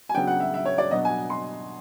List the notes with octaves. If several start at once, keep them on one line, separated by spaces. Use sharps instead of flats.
G#5
C#3 F#3 B3 D4 G5
F#5
E5
E5
C#5
D5
B2 F#3 B3 D4 D#5
G#5
C6